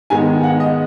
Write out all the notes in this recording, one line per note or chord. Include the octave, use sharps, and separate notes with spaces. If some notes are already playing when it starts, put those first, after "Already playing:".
G#2 D#3 G#3 B3 G#5
F#5
D#5